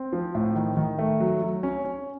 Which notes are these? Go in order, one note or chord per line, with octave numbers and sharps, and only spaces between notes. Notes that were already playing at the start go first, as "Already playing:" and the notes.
Already playing: C4
F3
A2
D#3
D#3
A3
F#3
F#3
C#4
C#4